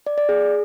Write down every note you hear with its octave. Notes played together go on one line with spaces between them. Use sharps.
D5
D5
G#4